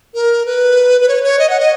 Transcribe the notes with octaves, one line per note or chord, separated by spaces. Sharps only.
A#4
B4
B4
C#5
C#5
D#5
F#5
D#5